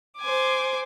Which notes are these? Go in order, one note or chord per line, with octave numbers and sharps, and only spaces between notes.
C5 G#5 D6